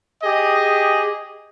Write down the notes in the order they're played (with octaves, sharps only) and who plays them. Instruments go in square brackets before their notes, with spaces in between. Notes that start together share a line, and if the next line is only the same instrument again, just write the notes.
[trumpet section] G4 G#4 D#5